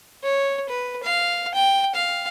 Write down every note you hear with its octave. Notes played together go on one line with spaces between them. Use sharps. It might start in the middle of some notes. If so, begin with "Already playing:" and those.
C#5
B4
F5
G5
F5